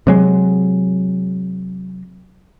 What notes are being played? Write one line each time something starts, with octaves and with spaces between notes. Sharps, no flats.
C3 F#3 G#3